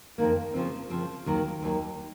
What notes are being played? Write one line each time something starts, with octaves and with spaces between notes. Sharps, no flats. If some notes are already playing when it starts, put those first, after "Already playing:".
F2 D#3 A#3
C#3 F3 C4
C#3 F3 C4
D#2 D#3 F#3
D#2 D#3 F#3